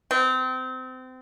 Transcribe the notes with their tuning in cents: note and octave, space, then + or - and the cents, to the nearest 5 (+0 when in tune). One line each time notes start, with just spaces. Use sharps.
C4 -30